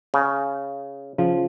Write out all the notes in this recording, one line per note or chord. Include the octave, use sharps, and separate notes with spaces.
C#3
C#3 F3